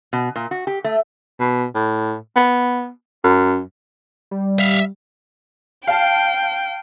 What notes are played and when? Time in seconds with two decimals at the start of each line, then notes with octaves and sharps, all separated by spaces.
0.13 B2
0.36 A#2
0.51 F#4
0.67 G4
0.84 A3
1.39 B2
1.75 A2
2.35 B3
3.24 F#2
4.31 G3
4.59 E5 F5
5.87 F5 G5 A5